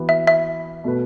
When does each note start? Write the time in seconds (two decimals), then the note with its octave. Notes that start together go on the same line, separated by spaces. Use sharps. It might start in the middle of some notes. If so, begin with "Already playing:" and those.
Already playing: E3 B3 F#4
0.09 E5
0.28 E5
0.84 B2 A3 F#4 B4